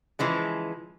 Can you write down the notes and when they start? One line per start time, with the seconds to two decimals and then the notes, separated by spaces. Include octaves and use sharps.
0.19 C#3 E3 F3 G#3